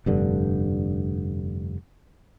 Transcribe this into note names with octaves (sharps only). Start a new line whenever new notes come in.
F1 G2 D3